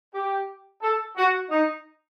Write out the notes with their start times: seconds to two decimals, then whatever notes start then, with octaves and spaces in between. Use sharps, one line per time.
0.15 G4
0.82 A4
1.17 F#4
1.50 D#4